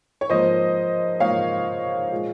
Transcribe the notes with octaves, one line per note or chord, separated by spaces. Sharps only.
C#5
G#2 F3 A#3 C5 D#5
G#2 F3 A#3 C#5 F5
A#2 G#3